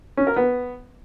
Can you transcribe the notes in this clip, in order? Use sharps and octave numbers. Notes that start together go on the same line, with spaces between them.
C#4
A#4
B3